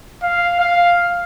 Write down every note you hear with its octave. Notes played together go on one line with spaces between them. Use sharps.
F5
F5